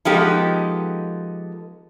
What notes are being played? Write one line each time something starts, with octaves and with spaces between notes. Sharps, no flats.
F3 G#3 B3 D#4 G4 A4